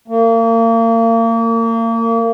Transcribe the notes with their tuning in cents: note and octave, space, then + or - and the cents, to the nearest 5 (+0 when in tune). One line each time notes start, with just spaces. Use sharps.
A#3 -35